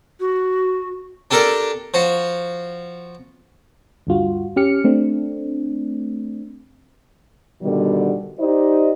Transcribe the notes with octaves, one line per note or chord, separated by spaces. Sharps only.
F#4
D4 G4 A4 A#4 D5
F3 F#4
D2 G2 F4 F#4
C#4 G4 F6 C#7
A3 C4 D4
B2 D3 D#3 G3
D#4 G4 C5 D5 D#5